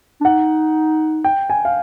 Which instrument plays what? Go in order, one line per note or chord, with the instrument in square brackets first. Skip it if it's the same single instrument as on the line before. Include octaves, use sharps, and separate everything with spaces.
[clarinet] D4
[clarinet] D#4 [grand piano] F#5
[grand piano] G5
G#5
F5